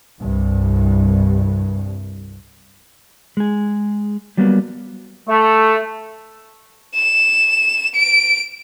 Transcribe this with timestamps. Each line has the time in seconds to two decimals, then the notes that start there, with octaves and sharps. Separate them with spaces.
0.20 C2 G2
3.37 G#3 G#4
4.37 F#3 G3 A#3 B3
5.28 A3
6.95 E7
7.95 D7